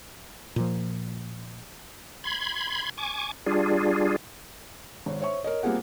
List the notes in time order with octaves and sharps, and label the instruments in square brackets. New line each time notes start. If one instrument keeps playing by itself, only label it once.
[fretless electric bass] A#2 F3
[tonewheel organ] B5 C6 G#6
G#5 C#6 D6
G3 D4 F4 G#4
[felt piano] G#1 C#5
C5 C#5 E5 C#6
A#4 C#5 D#5
G3 A#3 C4 F4 G#4 F#5